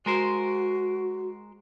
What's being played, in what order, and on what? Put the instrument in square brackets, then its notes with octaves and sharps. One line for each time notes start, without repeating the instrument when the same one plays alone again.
[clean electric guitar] G#3 A#4 C5 [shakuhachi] F#4